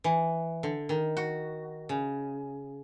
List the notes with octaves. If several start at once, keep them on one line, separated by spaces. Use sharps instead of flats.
E3
D3
D#3
F#4
C#3